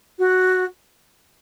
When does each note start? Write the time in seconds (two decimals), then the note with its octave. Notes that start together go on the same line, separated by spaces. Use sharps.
0.19 F#4